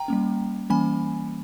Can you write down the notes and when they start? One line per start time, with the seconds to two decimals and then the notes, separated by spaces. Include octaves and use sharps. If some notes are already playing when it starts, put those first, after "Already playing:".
Already playing: G5 A#5
0.08 G3 A#3 C#4
0.70 E3 G3 A#3 C#4 G#5 B5